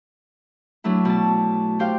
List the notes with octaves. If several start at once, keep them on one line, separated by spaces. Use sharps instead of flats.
F#3 A3 D4 E4
B2 A5
G4 C5 F5 G5